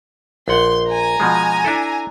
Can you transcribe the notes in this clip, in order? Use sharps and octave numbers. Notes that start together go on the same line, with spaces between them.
A#1 F#5 C6
G#5 A#5
B2 F3 G#3
D4 E4 A4